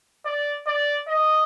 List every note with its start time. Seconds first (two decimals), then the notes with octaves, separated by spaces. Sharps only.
0.25 D5
0.67 D5
1.09 D#5